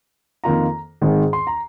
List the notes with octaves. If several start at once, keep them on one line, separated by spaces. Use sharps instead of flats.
F2 D#3 A#3 F4 A#5
G#2 D#3 G#3 C4
C6
A#5